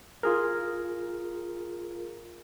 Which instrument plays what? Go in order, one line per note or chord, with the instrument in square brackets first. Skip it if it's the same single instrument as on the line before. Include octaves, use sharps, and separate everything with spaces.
[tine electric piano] F4 G#4 A#4